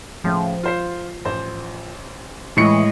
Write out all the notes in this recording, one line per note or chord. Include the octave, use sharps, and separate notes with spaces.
A2 C#3 F3
F4 C5 C7
A1 C5
A2 E3 G#3 D#5 C#7